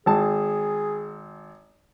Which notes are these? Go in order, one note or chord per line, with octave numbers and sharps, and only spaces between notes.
G#1 G#4 A5